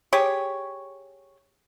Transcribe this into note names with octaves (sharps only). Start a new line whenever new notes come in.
G4 G#4 C#5